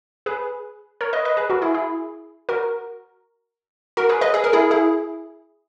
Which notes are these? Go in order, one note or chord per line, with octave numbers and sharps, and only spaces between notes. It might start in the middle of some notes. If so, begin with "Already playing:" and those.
G#4 B4
A#4 C#5
B4 D#5
B4 D#5
G#4 B4
F#4 A#4
E4 G#4
E4 G#4
F#4 A#4
F#4 A#4
G#4 B4
B4 D#5
G#4
A#4
E4 G#4
E4 G#4